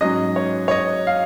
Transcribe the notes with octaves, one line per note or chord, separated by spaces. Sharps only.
G#2 F#3 C#4 D#5
C#5
C#5
D#5
F5